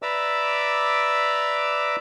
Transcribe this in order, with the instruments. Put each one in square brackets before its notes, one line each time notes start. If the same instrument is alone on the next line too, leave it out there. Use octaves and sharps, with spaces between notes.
[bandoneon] B4 D5 E5 A#5 D6 E6